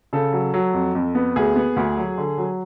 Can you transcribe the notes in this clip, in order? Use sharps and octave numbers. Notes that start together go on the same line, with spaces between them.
C#3 A4
F#3
F#3
F2
F2
B3
D2 G#4
B3
D2
F#3
D3
F#3